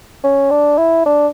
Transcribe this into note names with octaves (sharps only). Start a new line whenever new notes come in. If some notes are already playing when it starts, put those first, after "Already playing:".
C#4
D4
E4
D4